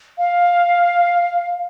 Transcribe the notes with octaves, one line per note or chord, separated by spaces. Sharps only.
F5